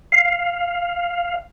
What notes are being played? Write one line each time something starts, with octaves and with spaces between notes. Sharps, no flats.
F5